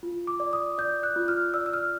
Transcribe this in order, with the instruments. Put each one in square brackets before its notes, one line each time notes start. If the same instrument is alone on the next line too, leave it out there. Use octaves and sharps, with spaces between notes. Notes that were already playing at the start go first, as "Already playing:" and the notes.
[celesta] F4
D6
D5
D#6
D5 G6
F#6
F4
F6
D5 E6
E6
F6